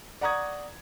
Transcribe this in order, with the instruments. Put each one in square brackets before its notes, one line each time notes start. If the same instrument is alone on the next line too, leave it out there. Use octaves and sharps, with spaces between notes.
[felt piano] D5 F#5 A#5 C#6 D#6 G#6